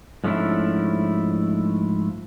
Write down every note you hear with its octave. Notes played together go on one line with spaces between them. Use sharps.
G#2 F3 A3 C#4 D4 E4